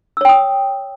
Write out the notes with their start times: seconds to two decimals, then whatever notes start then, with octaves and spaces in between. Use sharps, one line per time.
0.17 E6
0.21 C#5
0.25 G5
0.29 D#6